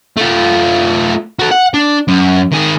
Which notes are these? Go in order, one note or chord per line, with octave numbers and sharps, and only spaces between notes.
A3 F4
F#4 A4
F#5
D4
F#2
D#3 G#4